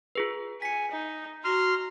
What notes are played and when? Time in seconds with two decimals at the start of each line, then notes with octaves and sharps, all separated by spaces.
0.15 F4 G#4 B4
0.62 G#5 B6 C#7
0.92 D#4
1.45 F#4 A#5 C6 F6